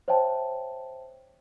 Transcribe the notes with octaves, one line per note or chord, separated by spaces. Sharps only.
C5 C#5 E5 G5 A5